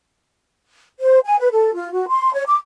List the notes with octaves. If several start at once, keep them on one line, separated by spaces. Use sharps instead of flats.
C5
G#5
B4
A4
F4
F#4
C6
C#5
D6